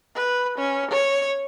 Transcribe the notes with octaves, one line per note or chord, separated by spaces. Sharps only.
B4
C#4
C#5